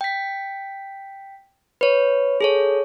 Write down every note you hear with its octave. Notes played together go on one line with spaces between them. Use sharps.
G5 B6
B4 C#5
G#4 A4 C#5